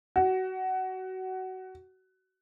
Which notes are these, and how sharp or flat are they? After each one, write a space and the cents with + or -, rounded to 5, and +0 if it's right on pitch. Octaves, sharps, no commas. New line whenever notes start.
F#4 +20